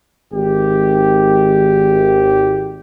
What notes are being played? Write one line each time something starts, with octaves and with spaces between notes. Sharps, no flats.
G#1 G4